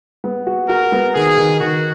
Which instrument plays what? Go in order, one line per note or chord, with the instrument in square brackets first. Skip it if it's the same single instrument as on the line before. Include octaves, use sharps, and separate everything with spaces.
[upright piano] B3
F#4
[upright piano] F#4 [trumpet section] A#4
[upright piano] B3
[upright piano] D#3 [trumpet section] G#4
[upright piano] D#3
[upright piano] D#3 [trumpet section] F#4